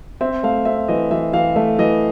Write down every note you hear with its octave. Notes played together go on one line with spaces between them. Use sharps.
C4 E5
A3 F5
C4 E5
E3 D#5
E3 E5
E3 F5
A3 E5
E3 D#5